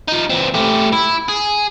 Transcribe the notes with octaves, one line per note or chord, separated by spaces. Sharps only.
F3 D#4
E3 C4
A3 G4
E4
G#4